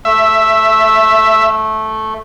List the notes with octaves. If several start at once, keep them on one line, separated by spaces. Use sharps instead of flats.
A3 E5